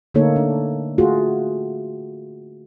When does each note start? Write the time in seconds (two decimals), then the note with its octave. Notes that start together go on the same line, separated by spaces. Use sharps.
0.15 D3 A3 A#3 D#4 A4 C#5
0.36 D4
0.98 A3 F4 F#4 G#4